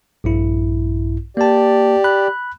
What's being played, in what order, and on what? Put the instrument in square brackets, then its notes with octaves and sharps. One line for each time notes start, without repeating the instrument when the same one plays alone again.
[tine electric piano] A#1 G2 E4
[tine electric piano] A#3 A5 [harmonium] G4 D5
[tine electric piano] B5 F#6